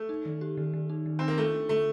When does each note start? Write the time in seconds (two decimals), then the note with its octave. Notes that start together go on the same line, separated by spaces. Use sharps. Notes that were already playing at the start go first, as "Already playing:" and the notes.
Already playing: A3
0.09 D#4
0.26 D#3
0.41 G4
0.57 D#3
0.73 D#3
0.89 D#4
1.06 D#3
1.19 C4 D#4
1.28 A#3
1.38 A3 F4
1.54 D4
1.69 D3 A3